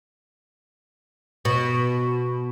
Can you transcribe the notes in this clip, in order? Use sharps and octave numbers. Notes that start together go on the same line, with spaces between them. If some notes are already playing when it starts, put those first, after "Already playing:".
B2